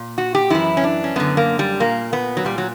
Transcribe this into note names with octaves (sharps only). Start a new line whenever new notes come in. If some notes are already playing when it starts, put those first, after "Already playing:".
Already playing: A#2
F#4
G4
F#2 E3 E4
C#4
D4
C#4
F#2 D3 B3
A#3
G3
A#2 A#3
B3
F#3
A#2 G3
F#3